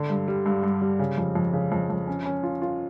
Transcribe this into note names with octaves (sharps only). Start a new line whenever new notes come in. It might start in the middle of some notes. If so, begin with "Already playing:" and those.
Already playing: D3
G2
G3
G2
G2
G3
C#3
F2
F2
C#3
F2
F2
C#4
C#4
F4
F4